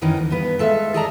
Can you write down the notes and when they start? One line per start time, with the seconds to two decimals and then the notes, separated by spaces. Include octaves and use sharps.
0.02 F#2 D#3 E3 C#4 D#4
0.17 D2
0.30 G2 B3 B4
0.59 G#3 A4 E5 F5
0.94 G#4 A4 D5 D#5 A5 A#5